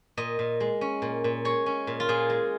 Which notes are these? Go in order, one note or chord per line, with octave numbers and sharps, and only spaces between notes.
A#2 D#5
A#2
G#3
C#4
A#2
A#2
G#3 C#5
C#4
A#2
F4
A#2 G#4
G#3